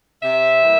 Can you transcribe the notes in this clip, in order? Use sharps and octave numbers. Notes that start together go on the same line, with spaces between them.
C3 E5
E3 G3 A#3